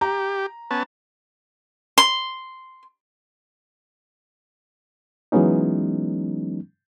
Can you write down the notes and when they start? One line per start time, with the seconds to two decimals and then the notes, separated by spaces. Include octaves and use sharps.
0.01 G4 A#5
0.71 B3 C#4 A5
1.98 C6
5.32 E3 F#3 G#3 B3 C#4 D#4